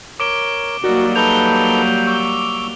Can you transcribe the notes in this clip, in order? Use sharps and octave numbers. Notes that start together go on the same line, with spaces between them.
A#4 C#5 D6 D7 G7
F#3 G3 A#3 D#4 F#4 A#4 D5
D#4 A4 B4 G6 F7 G7
C#6 D6 E6